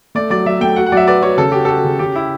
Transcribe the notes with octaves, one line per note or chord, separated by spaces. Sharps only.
A3 D5
F#3 D5
F#3 E5
A3 G5
F#4 F#5
F#5
F#3 D5 E5
B4 D5
F#4 C#5
C#3 A4
F#4 G4
F#4 A4
C#3
C#3 G4
E4